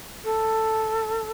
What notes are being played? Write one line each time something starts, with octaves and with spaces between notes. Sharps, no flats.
A4